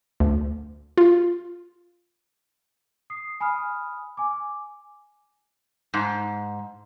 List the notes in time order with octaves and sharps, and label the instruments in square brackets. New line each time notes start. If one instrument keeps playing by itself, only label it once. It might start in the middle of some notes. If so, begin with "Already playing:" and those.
[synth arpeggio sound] D2
F4
[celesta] D#6 C7
G#5 B5 D#6 F6
G#5 D6
[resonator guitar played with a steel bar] G#2